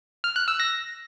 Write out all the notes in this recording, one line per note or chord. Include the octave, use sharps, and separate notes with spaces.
F6
F#6
E6
A#6